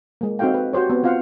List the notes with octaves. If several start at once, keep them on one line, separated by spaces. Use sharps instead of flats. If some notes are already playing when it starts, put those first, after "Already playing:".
G#3 A#3
C4 D#4 F#4 A4 F5 G5
B4
F#4 G4 C5 C#5
B3 C4
C4 F4 C5 F5 F#5